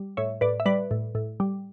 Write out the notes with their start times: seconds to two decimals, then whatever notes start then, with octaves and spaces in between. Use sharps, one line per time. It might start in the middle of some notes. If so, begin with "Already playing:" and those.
Already playing: G3
0.17 A2 C#5 E5
0.41 A2 B4 D5
0.60 E5
0.66 G3 B4 D5
0.91 A2
1.15 A2
1.40 G3